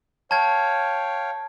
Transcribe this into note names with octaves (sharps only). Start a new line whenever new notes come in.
C#5 F5 G5 A5 G#6